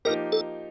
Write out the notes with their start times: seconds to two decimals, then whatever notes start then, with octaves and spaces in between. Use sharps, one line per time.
0.05 F3 A#3 D#4 G4 A#4
0.32 A4